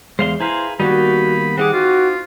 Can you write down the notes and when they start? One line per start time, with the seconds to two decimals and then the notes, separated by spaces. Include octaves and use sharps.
0.19 E2 G#3 C5 F5 C6
0.40 E4 G#4 B4 C5 F5 A#5
0.80 D#3 G3 A#3 B3 D#4 F#4 B5
1.58 C4 D#4 G#4 F#5 D6
1.73 F4 F#4